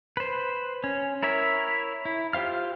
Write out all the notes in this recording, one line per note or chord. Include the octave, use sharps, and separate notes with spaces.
B4 C5
C#4
E4 A#4 C#5 E5
E4
F4 G4 C5 F5 F6